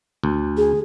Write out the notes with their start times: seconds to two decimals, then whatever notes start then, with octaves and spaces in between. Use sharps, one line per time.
0.24 D2
0.57 G#4